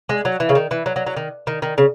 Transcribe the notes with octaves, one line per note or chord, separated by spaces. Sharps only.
G#3
F#3
E3
C#3
D#3
E3
F#3
F#3
F#3
D#3
D#3
D#3
C#3